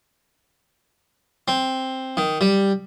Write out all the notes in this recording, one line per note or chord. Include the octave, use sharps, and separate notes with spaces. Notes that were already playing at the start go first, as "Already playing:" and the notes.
C4
D#3
G3